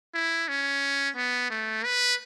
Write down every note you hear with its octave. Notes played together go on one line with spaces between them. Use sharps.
E4
C#4
B3
A3
B4